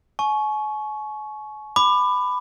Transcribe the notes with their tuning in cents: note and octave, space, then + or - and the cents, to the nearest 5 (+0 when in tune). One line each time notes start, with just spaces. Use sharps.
G#5 +40 C#6 +0
B5 +15 D6 +25